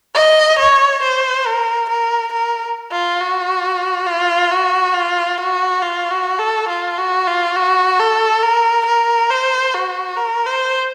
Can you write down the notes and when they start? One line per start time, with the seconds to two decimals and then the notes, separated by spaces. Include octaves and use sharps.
0.15 D#5
0.59 C#5
1.03 C5
1.46 A#4
1.90 A#4
2.33 A#4
2.92 F4
3.20 F#4
4.07 F4
4.52 F#4
4.94 F4
5.38 F#4
5.82 F4
6.11 F#4
6.39 A4
6.69 F4
6.99 F#4
7.27 F4
7.57 F#4
8.00 A4
8.43 A#4
8.86 A#4
9.30 C5
9.74 F#4
10.17 A#4
10.46 C5